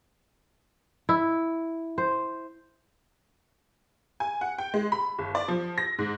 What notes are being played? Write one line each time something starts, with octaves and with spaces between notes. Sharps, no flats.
E4
C5
G#5
F#5
G5
G#3
B5
G1
D5
F3
A#6
G#2